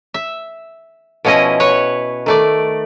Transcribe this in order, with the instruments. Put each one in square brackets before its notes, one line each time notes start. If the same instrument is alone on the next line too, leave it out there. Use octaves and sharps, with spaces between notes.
[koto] E5
B2 F3 C#4 E4 D#5
B4 C#5 F#5
D#3 A3 D5